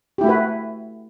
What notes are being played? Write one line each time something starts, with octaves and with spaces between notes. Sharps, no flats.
A3 E4 F#4 G4 B4